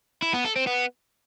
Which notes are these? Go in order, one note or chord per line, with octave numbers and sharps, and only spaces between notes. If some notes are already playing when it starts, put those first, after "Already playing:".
E4
B3
A4
C4
B3